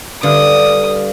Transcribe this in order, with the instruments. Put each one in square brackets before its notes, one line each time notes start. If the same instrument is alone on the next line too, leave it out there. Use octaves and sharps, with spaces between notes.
[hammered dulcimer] G2 F5 [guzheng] D3 [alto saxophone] D5 [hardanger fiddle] D#6